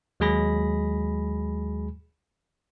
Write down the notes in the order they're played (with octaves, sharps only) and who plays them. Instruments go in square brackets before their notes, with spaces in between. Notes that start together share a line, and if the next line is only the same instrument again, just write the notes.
[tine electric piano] D#2 F#3 G#3 G#4 B5 A#6